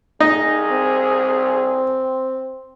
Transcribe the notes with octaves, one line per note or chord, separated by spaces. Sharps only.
C2 D#4 G#4
C4